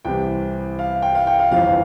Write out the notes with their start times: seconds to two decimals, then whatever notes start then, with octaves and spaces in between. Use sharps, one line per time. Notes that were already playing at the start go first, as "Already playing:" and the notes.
0.05 C2 C3 E3 G5
0.79 F5
1.02 G5
1.15 F5
1.27 G5
1.39 F5
1.51 G1 F2 E3 F5